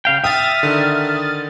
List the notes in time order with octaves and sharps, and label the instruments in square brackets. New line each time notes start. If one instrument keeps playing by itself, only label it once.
[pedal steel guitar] C#3 F5 G5
[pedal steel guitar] E5 [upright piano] G5 [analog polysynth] D#6 F6 A6
[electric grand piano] D3 D#3